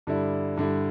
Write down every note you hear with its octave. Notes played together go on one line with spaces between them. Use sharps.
G2 D3 G3 E4
G2 D3 G3 E4